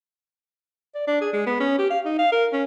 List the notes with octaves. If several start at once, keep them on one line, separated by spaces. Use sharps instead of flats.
D5
D4
G#4
G#3
B3
C#4
G4
F5
D#4
F5
A#4
C#4